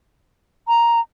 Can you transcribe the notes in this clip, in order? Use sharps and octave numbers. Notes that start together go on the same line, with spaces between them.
A#5